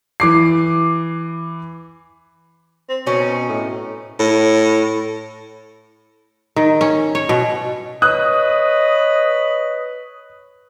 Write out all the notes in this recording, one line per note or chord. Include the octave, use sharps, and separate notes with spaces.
E3 D6 C7
C4
B2 C4 C#4 D#4
A2
A2
D#3
C#4
C#5
B2
B4 C#5 D#5 D#6 F#6